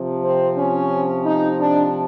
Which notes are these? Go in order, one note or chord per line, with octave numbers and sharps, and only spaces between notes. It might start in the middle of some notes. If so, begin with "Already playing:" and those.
Already playing: C3 F3
C4
C#4
D#4
D4